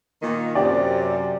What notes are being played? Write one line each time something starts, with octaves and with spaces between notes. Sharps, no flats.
A#2 D#3
F#2 C3 G4 D5